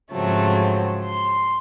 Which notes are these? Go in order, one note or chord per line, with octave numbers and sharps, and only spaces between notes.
G#2 C#3 F3 F#3 A3 C4
C6